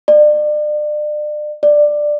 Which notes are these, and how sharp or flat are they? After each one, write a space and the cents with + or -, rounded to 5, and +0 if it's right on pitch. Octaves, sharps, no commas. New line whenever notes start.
D5 +35
D5 +10